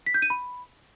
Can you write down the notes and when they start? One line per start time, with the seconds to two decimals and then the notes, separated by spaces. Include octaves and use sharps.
0.06 B6
0.14 G6
0.22 D#7
0.30 B5